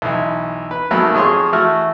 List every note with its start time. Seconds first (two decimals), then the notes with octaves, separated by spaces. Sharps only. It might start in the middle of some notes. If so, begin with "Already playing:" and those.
0.02 B1 E3
0.71 B4
0.91 G#1 F#3 A3 A#3 B5
1.15 F2 G#4 C#5 C6
1.53 E3 A3 F#4 F6